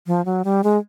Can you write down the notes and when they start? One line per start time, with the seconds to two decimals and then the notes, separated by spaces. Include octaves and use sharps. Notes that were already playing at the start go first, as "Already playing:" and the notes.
0.07 F3
0.25 F#3
0.44 G3
0.64 G#3